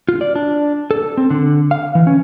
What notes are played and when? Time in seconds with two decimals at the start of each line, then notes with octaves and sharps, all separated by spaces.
0.09 F4
0.21 D5
0.36 D4
0.91 A4
1.17 C4
1.30 D3
1.71 F5
1.95 E3
2.07 C#4